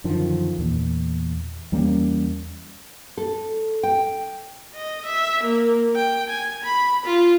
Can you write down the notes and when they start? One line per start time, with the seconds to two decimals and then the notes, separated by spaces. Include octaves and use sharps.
0.04 F#2 D3 D#3 F3
0.59 E2 A#2
1.72 E2 G3 A#3 C#4
3.18 A4
3.83 G5
4.74 D#5
5.06 E5
5.43 A#3
5.95 G5
6.29 G#5
6.64 B5
7.05 F4